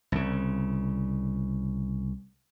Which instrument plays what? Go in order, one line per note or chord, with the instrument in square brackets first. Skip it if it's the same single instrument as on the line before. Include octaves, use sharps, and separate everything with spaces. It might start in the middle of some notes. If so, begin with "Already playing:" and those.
[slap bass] C2 C#3